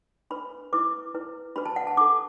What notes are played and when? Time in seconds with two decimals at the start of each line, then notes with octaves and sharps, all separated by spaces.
0.30 D4 B4 B5
0.73 E4 B4 D6
1.15 E4 B4
1.56 D4 F#4 B4 B5
1.66 A5
1.76 F#5
1.87 A5
1.97 D4 A4 D6